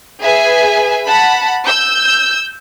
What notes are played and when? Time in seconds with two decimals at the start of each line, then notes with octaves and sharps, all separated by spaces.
0.20 G#4 B4 E5 G#5
1.08 F#5 A5 B5
1.66 E6 G6